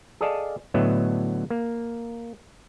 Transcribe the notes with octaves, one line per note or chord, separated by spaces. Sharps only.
G#4 A4 D5 D#5 F5 A5
A2 D3 F#3 B3 D#5 E5
A#3